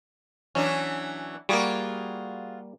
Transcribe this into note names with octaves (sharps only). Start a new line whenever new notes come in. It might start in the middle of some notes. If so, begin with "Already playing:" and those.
E3 F#3 C#4 D4
G3 A#3 F4 F#4 G#4